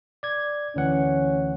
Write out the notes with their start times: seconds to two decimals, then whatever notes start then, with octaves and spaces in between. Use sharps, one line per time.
0.23 D5 G#6
0.76 D2 E3 C#4 F#5